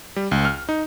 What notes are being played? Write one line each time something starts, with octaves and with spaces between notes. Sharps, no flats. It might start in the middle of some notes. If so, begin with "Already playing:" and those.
G3
C#2
F6
D#4